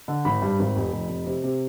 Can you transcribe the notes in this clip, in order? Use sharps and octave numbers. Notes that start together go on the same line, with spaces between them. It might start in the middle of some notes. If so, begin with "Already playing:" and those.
D3
G#1 B5
G2
G#1
F1
F1
F1
C3
C3